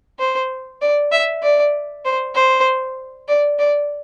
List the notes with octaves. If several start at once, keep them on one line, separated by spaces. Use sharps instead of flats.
C5
D5
E5
D5
C5
C5
D5
D5